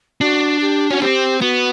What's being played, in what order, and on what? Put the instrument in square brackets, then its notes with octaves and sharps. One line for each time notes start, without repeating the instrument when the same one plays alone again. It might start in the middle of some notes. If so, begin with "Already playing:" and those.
[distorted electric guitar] D4 [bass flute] F#4
[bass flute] G4
[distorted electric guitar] C#4 [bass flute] F#4
[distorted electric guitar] C4 [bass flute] G4
[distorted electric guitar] B3 [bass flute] F#4